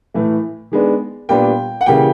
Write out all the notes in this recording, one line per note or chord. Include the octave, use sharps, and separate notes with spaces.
A2 E3 A3
D#3 G#3 B3 D4
A#2 G3 B3 D4 G5
F#5
C#3 E3 G3 A#3 G5